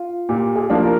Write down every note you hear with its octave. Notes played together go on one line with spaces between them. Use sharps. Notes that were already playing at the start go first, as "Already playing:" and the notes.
Already playing: F4
A#2 G4
G#4
F3 A#3 D4 F4
A#4